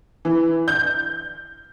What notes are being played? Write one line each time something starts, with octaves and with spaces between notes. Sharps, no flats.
E3
G6